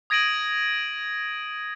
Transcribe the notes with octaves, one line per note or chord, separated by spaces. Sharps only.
D#6 G#6 A#6 D7 D#7 F#7